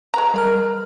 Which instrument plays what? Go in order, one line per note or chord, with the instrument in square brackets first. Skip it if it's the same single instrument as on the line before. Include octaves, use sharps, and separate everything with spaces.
[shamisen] G#3 B4 A#5
[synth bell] G3 A#4 F6